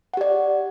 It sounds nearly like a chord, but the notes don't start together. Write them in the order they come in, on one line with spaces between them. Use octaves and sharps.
F#5 G4 D5